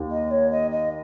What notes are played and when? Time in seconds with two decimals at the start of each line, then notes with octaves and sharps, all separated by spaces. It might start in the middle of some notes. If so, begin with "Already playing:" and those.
Already playing: D#2
0.11 D#5
0.31 C#5
0.51 D#5
0.71 D#5